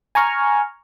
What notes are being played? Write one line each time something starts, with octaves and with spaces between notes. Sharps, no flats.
G#5 A#5 C#6 F6